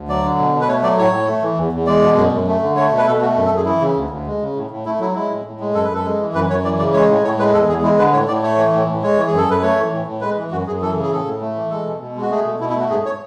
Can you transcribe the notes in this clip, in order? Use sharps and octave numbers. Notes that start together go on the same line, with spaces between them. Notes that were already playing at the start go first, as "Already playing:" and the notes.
Already playing: D2
F#3 D5
D3
B2
B2
B4
A3 C#5
F#3 D5
A2 C#5
A2
A3
E3
E2
E2
G#3 D5
B2
F#2
F#2
A3
D3
A3 C#5
B2
B4
B2 A4
A3 F#4
F#2
A4
F#2 G#4
E3 E4
C#3
D2
D2
G#3
C#3
A2
A2
A3 E4
F#3 E4
G#3 E4
A2
A2
G#3
F#2 A4
B4
F#2
A4
G#3
E3
F#2 B4
F#2 C#5
E3 D5
C#3 D5
G#3 C#5
A2
A2 C#5
G#3 B4
E2 A4
E2 G#4
G#3 E4
D3 B4
A2 C#5
A2 D5
A3 C#5
E3
A2
A2
G#3 C#5
E3
G#4
F#2
A4
F#2 B4
A3 C#5
E3
A2
A2
G#3 B4
E3
F#2 F#4
F#2 G#4
E3 A4
C#3
G#4
A2 A4
A2
A3
E3
G#3 A4
B2
B2
G#3
F#4
A3 G#4
B2
B2 E4
E4
A3 F#4
G#2 G#4
C#5